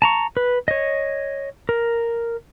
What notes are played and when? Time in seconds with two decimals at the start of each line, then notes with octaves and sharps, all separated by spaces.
0.02 A5 A#5 C#6
0.37 B4
0.68 C#5 D#5
1.69 A#4